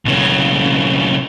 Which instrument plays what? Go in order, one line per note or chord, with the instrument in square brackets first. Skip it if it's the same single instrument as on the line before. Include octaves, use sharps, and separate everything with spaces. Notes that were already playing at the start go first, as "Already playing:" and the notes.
[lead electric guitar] B1 C#3